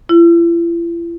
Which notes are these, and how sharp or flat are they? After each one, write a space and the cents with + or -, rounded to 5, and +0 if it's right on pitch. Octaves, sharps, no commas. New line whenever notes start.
E4 +45